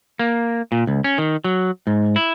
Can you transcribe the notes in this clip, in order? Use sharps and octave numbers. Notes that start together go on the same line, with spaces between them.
A#3
A#2
C#2
C#4
D#3
F#3
G#2
E4